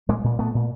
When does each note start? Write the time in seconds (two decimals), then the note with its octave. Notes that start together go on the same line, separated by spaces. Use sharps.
0.09 A#2 G#3 A#3
0.24 A#2
0.39 A#2 A3 B3
0.54 A#2